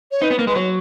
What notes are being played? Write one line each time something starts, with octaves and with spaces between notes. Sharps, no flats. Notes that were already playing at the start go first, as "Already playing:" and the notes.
C#5
D#4 B4
B3
A#3
G#3 B4
F#3 C#5